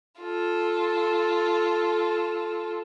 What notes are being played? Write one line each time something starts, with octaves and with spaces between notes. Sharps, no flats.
F4 A4